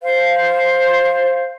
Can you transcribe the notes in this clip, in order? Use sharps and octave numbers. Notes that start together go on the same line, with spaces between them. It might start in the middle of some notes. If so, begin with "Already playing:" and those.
C5 F5